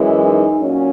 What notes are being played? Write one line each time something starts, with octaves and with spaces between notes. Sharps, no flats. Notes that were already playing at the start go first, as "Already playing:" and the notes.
Already playing: F#2 E3 G#3 E4
D#4
A#2 F#3 C#4